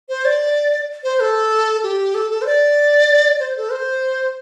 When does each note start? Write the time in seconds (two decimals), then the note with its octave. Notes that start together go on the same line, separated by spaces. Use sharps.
0.09 C5
0.25 D5
1.04 C5
1.20 A4
1.83 G4
2.15 A4
2.30 A4
2.42 C5
2.46 D5
3.40 C5
3.57 A4
3.72 C5